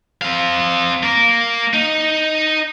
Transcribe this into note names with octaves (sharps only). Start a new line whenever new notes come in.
C4 F5
A#3 A#4
D#4